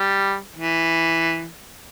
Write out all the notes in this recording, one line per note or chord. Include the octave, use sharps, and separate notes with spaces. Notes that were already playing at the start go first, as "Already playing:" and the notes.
Already playing: G3
E3